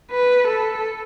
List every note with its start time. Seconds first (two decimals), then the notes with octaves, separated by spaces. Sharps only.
0.11 B4
0.48 A4